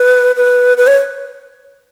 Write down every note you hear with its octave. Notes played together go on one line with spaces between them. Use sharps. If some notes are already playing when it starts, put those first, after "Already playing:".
Already playing: B4
B4
B4
C#5